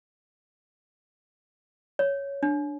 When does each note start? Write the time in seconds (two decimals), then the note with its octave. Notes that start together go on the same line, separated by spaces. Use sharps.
1.99 C#5
2.43 D4